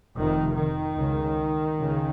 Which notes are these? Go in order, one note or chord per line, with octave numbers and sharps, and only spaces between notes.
F1 F2 C3 D#3
D#3
C#2 C#3
C#2 C#3